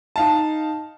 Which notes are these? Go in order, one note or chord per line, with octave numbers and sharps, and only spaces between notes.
D#4 F5 A5